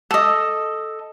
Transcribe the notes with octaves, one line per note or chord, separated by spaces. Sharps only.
A4 D#5